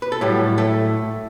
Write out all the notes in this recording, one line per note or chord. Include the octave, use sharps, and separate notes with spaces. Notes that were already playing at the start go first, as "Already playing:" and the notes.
B4
A4
A2 F#3 G3 G4
A3 A4